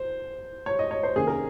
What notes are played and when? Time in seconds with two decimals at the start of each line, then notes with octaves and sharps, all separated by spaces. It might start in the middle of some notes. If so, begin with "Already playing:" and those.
Already playing: C5
0.66 C#5
0.79 D#5
0.91 C#5
1.03 C5
1.16 C3 D#3 A#3 C#4 G#4
1.27 A#4